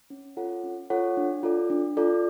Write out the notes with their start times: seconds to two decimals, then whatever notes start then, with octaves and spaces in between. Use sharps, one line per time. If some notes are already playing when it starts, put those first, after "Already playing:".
0.10 C#4
0.37 F4 A4 C#5 F#5
0.64 C#4
0.90 F4 A4 C#5 F#5
1.17 D4
1.43 F4 A4 D5
1.70 D4
1.97 F4 A4 D5